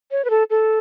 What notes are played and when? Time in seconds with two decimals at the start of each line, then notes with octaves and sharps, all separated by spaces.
0.11 C#5
0.25 B4
0.30 A4
0.50 A4